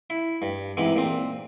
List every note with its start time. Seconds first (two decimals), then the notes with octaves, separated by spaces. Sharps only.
0.10 E4
0.42 G2
0.77 G#2 C3 E3
0.96 A#2 C4